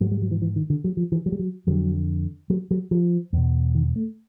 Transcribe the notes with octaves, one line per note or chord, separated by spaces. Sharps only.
G#2 F#3
G3
F#3
E3
E3
D#3
D3
F#3
F3
E3
F#3
G3
F#3
F2 D3 F#3
F#3
F#3
F3
E2 B2
D#3
A3